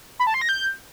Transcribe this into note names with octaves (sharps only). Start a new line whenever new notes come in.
B5
A5
C6
A#6
G6